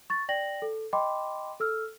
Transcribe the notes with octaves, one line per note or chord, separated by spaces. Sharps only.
C#6 A6
D5 G5 A#6 F#7
A4
D#5 G5 B5 C6 D6
A4 E6 F6